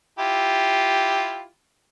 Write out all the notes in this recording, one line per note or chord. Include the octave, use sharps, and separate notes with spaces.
E4 F4 G4